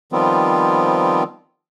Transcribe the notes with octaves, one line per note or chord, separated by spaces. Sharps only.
D#3 F3 G3 B3 C4 F4